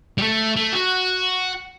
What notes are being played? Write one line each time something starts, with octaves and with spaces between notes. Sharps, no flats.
G3
A3
A3
F#4